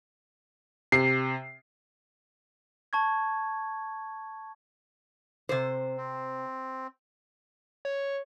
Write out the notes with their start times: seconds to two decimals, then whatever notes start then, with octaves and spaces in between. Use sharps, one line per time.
0.92 C3 C7
2.93 A5 C#6 G#6
5.49 C3 C5
5.98 C4
7.85 C#5